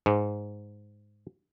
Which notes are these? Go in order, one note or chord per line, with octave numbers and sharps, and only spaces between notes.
G#2